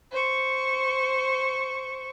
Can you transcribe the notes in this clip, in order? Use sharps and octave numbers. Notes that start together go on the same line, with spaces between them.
C5 C#6